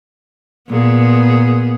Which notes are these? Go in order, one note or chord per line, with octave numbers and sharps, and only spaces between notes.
A#2 B3 G#4